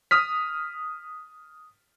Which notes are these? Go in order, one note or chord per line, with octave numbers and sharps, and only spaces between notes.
D#6 F6 B6